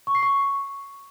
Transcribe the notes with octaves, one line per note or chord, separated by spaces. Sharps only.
C#6
C7
C#6